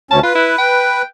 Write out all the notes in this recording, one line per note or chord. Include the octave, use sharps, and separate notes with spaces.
D2 C#4 A5
F4 B4
E4
G5